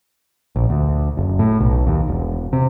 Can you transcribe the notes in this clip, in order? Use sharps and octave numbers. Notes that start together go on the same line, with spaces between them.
A#1
D2
F#1
A2
B1
D#2
E1
C3